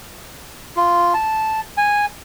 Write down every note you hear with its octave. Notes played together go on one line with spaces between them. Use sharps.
F4
A5
G#5